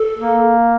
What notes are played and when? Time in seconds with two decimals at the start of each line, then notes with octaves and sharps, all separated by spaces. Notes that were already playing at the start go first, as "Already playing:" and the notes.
Already playing: A4
0.18 A#3